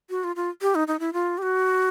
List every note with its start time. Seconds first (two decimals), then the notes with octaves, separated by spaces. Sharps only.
0.10 F#4
0.24 F4
0.36 F4
0.62 G4
0.75 D#4
0.88 D#4
1.00 E4
1.13 F4
1.38 G4
1.42 F#4